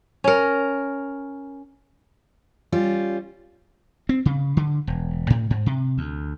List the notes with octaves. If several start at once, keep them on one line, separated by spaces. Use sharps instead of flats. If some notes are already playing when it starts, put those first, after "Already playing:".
C#4 A#4
G3 C#4 F4
C4
C#3
D3
E1
A2
G#2
C3
D2